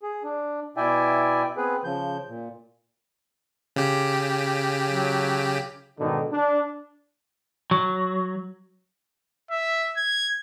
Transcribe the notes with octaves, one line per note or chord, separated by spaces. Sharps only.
G#4
D4
B2 E4 D5 E5 G5 G#5
B3 C4 G#4 B4
C#3 F3 G6
A#2
C#3 G4
F#3
G#2 B2 D3 D#3 D#4
D4
F#3
E5
G#6